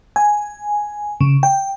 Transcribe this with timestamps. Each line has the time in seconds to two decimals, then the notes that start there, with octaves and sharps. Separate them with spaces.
0.16 G#5
1.21 C#3
1.43 G5